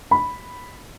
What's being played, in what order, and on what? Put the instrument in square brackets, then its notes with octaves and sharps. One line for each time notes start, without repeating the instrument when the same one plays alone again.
[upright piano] B5